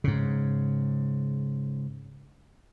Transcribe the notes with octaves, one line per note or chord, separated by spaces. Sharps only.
G#2 C#3